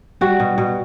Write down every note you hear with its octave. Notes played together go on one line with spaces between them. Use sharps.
G3 F#4
B2
B2